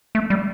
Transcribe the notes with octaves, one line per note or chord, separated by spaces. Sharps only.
A3
G3